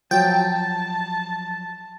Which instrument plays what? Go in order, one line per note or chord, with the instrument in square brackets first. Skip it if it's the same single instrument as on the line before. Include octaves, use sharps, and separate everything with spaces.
[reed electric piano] F3 F#3 [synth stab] G5 [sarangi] A5